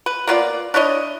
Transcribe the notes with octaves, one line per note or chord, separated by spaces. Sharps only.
B4
A#3 B3 F4 D5
D4 E4 C#5 D#5